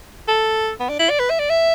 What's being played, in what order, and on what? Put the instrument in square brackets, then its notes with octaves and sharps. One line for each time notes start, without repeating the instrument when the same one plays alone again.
[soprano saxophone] A4
B3
D4
E4
D5
B4
E5
D5
E5